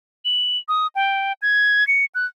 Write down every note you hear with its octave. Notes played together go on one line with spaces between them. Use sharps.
F#7
D#6
G5
G#6
C#7
F#6